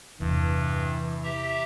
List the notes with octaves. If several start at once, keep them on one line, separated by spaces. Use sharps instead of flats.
E2 G2 C3 E3
G4 E5 A#5